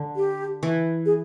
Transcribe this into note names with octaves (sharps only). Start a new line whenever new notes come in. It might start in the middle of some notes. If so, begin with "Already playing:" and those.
Already playing: D3
G4
E3
G#4